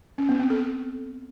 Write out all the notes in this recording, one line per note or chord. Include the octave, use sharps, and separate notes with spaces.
C#4
B3
C4
A4